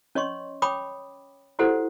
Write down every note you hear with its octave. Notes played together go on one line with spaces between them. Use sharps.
C#4 C#5 D#5 C6 C#6
C#5 G5 B5 D6 D#6
E4 F#4 G4 A4 C5 F#5